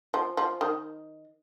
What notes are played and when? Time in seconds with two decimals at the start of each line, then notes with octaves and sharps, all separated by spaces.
0.14 F3
0.37 F3
0.61 D#3